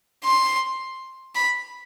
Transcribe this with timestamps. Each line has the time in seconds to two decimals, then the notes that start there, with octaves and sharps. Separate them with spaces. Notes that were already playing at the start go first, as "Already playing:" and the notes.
0.24 C6
1.35 B5